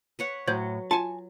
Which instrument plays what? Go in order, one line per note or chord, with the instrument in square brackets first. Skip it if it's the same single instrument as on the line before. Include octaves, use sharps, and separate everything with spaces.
[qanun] B4 C#5 F#5
[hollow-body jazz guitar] A2 [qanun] F#3 [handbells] C5 C#5
[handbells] F4 C#7 [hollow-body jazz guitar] G#5 A5